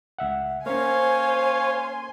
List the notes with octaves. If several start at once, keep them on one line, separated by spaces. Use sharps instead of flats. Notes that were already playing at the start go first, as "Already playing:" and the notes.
C#2 E5 F#5
A#3 C#4 C5 C#5 F5 G#5 C6